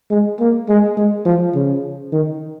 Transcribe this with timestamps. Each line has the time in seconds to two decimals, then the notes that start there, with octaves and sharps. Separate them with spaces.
0.11 G#3
0.40 A#3
0.69 G#3
0.97 G#3
1.26 F3
1.55 C#3
2.12 D#3